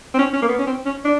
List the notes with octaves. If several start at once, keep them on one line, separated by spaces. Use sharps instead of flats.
C4
C#4
C#4
A#3
B3
C#4
C4
C#4
D4